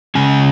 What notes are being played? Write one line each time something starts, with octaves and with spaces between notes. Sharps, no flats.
C#3 G#3 C#4 G#5